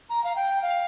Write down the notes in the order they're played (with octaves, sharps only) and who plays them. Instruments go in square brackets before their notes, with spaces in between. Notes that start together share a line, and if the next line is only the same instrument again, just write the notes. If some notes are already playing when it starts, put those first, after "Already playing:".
[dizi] A#5
F5
G5
F5